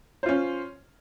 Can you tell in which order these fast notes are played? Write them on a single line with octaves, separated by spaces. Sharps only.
C5 F4 C#4